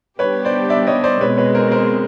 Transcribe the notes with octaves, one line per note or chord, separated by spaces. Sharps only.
G3 B3 D4 G4 B4 C#5
C5 D5
D5 E5
C#5 D#5
C5 D5
B2 G#3 C4 B4 C#5
B4 C#5
A#4 C5
A#4 C5